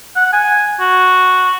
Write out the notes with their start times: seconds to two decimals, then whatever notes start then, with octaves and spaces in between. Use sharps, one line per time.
0.16 F#5
0.33 G#5
0.80 F#4